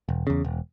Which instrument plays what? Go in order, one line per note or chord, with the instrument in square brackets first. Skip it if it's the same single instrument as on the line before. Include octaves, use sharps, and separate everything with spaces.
[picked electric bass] E1
E2 C#3
E1